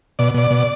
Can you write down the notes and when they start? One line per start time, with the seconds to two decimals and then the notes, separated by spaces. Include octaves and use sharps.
0.19 B2 D5
0.34 B2 D5
0.51 B2